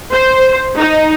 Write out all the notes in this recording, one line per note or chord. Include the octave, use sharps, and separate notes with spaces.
C5
D#4